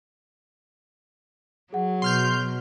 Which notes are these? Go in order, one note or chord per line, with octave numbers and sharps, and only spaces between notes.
F#3 G#4 F#5
B2 C6 F6 G6